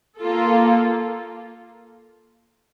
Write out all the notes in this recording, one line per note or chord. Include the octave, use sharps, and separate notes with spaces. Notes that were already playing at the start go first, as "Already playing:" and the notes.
A#3 F4 A4